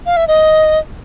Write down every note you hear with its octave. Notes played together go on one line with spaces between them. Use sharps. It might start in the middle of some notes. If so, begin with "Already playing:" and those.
F5
E5
D#5